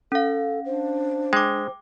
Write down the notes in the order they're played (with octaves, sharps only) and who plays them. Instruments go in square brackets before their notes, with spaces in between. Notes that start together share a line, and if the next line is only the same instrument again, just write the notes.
[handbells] C#4 F5 [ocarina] A4
[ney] D4 [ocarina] C5
[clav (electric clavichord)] G#3 [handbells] G5 D6